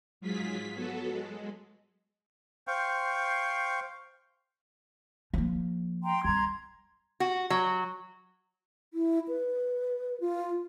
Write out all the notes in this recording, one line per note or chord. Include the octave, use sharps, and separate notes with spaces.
G#2 F#3 F4 G#4 B6
F#3 B3 F#4 A4
G#3
C5 F5 G5 C#6
F3 A#3
G5 A#5 C6
G3 C4 A#5 C6 G#6
F#4
F#3
E4
B4
F4